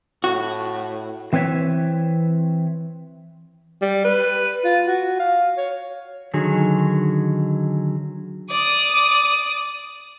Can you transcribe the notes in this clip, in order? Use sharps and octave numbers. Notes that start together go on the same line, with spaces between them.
A2 F#4
E3 C4 B4 C#5 E5
G3
B4
F4
F#4
F5
C#5
D3 D#3 F#3 G#4
D5 D#6